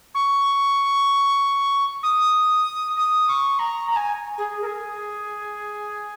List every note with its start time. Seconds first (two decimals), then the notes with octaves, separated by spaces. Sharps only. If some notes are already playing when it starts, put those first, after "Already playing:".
0.14 C#6
2.03 D#6
2.96 D#6
3.28 C#6
3.59 A#5
3.91 A#5
3.95 G#5
4.37 G#4
4.61 A#4
4.65 G#4